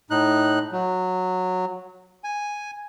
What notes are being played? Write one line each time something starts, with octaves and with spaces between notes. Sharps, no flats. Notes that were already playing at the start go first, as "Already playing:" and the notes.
A2 D#4 F#6
F#3
G#5